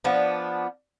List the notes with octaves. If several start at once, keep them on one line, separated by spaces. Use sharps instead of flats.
F3 B3 D4